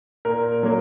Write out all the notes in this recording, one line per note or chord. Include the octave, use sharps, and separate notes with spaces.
A#2 A#4
F#3 A#3